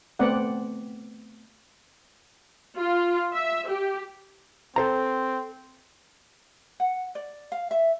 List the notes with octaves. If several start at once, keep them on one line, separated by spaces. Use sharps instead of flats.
A3 B3 C4 D5 F#5
F4
E5
G4
C4 A4 C5 A#5
F#5
D5
F5
E5